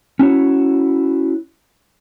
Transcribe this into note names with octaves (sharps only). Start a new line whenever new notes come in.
C#4 E4 F#4 C#5